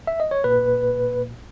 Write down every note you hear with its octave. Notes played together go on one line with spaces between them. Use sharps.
E5
D#5
C#5
A#2 A#3 B4